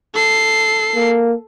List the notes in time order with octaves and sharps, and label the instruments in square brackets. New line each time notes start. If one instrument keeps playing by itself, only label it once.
[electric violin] A4 C7
[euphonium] A#3